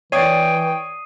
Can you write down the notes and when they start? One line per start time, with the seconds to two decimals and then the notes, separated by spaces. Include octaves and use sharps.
0.12 E3 C#5 D5 G5 D#6 C7 D#7